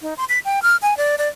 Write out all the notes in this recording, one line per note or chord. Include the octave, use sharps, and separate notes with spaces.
D#4
C6
B6
G5
F6
G#5
D5
D5